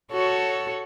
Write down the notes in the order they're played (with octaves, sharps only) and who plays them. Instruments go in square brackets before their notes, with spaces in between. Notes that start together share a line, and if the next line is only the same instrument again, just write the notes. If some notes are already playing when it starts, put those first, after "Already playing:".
[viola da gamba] F#4 A4 C#5